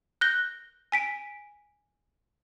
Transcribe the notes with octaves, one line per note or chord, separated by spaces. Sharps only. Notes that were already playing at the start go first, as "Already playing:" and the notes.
F#6 G6 A#6 G7
G#5 B6 D7